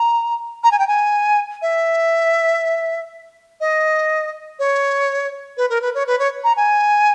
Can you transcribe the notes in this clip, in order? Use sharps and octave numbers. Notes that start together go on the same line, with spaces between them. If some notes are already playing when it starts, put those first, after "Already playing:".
Already playing: A#5
A#5
G#5
G5
G#5
E5
D#5
C#5
B4
A#4
B4
C#5
B4
C#5
A#5
G#5